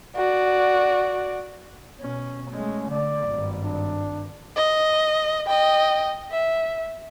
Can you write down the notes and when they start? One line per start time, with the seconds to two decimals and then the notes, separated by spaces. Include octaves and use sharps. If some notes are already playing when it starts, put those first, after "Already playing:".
0.16 F#4 D5
2.00 B2 C#4
2.51 G#3 A3 C#4
2.90 D3 D5
3.28 G#1 G2
3.64 D4
4.56 D#5
5.47 D#5 G5
6.31 E5